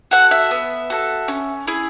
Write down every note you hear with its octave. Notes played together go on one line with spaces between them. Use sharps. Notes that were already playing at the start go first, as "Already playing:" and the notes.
F#4 A4 F#5
E5
B3
F#4 A4
C#4
E4 G#4